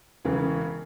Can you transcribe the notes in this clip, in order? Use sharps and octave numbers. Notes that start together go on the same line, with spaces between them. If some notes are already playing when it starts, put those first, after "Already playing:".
E1 C#3 E3